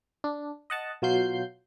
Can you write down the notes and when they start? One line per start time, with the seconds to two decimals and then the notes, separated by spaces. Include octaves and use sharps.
0.24 D4
0.70 D#5 F#5 A5
1.02 B2 F#3 F4 G6 C7